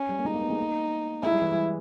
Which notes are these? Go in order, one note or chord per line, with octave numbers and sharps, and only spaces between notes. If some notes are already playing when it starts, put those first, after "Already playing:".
Already playing: C#4
G3
A#3
G#3 D#4
A#3
B3
G#3
A#3
G#3 E4
G3
E3
G3